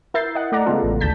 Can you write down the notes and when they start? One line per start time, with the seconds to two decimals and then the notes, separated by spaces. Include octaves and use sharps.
0.14 E4 A#4 E5 G6 A6 C7
0.35 D#5 F#5
0.52 A3 D5 F#5 A#5
0.66 C#3 G#3 B3 F4 A4
0.83 A1
1.01 D2 A5 G6 B6